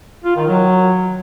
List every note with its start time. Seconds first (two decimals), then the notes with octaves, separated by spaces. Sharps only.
0.25 F4
0.36 D#3
0.48 F#3